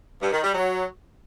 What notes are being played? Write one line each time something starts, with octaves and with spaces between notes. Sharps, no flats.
G2
D#3
G3
F#3